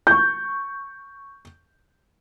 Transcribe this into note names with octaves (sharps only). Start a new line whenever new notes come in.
C#6 G6